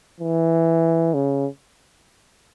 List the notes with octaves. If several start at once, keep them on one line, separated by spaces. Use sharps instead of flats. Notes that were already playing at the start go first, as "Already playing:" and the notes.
E3
C#3